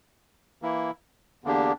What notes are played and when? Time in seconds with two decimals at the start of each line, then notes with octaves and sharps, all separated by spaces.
0.62 E3 A#3 E4
1.44 E2 D3 A#3 D4 G4